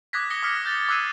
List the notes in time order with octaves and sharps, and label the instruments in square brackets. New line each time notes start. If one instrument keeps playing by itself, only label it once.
[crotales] D6 D#6 F#6 G#6 A#6 B6
D#6 A#6 C#7 G7
D6 D#6 F6 B6 C#7
G6 A6 G7
D6 E6 F#6 G#6 C7 D#7